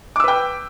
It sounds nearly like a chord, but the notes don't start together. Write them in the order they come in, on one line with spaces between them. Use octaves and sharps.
D6 E6 B4 G5